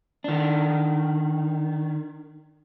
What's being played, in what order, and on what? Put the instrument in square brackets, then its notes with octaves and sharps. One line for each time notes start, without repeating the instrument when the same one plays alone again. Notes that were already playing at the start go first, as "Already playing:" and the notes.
[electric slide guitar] D#3 D4